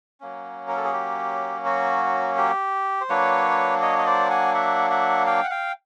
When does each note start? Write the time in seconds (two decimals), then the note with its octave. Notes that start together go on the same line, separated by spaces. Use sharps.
0.20 F#3 A#3 C#4
0.68 A#4
0.77 A4
0.85 G#4
0.93 G4
1.65 F#4
2.37 G4
3.01 C5
3.10 F#3 A#3 D4 B4 C#5
3.82 C#5 D#5
3.98 D#5
4.06 C5 D5
4.30 F#5 G#5
4.54 E5 F#5
4.91 E5 F#5
5.26 F5 G5
5.44 F#5
5.50 F5 G5